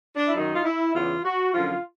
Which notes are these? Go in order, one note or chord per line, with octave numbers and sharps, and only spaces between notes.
D4
E4
F#2 D#3 D#4
F4
E4
E2 C#3 E3 F4
F#4
F#2 D3 F3 F4